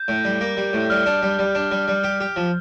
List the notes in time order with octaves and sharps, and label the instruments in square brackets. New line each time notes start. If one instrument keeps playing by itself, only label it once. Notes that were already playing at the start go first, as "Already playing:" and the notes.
Already playing: [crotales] G6
[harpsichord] A2
G3
A#3
G3
A2
[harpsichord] G3 [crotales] F6
[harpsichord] D4
G3
G3
D4
G3
G3
G4
G4
F3